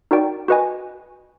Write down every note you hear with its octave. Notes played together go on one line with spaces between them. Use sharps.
D#4 F#4 A#4 D5 G5
F#4 B4 D#5 G#5